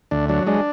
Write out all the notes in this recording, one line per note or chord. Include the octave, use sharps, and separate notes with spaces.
D2 D4
F#3 D4
G#3 D4